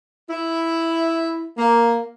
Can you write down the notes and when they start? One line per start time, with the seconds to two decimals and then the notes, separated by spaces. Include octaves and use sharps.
0.29 E4
1.58 A#3